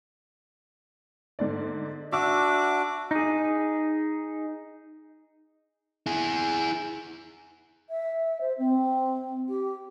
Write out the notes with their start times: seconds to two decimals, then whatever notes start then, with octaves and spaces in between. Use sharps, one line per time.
1.39 G#2 D3 D5
2.12 D4 F#4 E5 D6 E6
3.11 D#4 G#4
6.06 E4 G#4
7.88 E5
8.41 C5
8.58 C4
9.48 G4